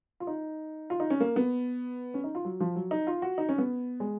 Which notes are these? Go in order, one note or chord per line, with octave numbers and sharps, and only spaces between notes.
F4
D#4
F4
D#4
C#4
A#3
B3
C#4
D#4
F4
F#3
F3
F#3
D#4
F4
F#4
D#4
C#4
B3
G#3